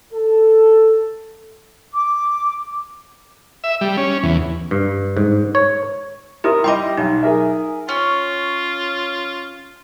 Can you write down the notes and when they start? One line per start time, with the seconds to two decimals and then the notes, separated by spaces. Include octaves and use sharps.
0.13 A4
1.93 D6
3.64 E5
3.81 G3
3.97 C#4
4.23 E2
4.71 G2
5.17 G#2
5.55 C#5
6.44 E4 G4 A#4 D#6
6.64 G3 E4 D#5 G5 C6 D6
6.97 B1 D#4
7.23 G#4 A#4 E5
7.89 C#4 F4